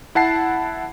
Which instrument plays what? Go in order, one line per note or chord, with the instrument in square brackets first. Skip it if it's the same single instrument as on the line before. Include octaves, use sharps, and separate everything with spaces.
[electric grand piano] E4 F#5 A5 C7